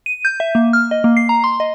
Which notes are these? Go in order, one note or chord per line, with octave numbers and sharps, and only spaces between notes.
D#7
G6
E5
A#3
F6
D#5
A#3
C7
A#5
C6
D#5